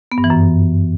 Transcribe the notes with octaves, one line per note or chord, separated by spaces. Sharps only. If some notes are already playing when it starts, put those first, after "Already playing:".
B3
G2
E3
F#2